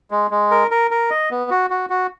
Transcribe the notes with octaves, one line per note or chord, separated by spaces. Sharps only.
G#3
G#3
A#4
A#4
A#4
D#5
B3
F#4
F#4
F#4